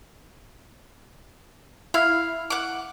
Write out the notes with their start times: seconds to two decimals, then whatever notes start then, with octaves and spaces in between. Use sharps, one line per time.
1.94 E4 F5
2.50 F#5 D6